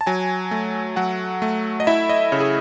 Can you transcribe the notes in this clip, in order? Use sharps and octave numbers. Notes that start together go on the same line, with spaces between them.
A5
F#3 G#5
A3
F#3 F#5
A3
D#5
E4 E5
D#5
C#3 C#5
G#4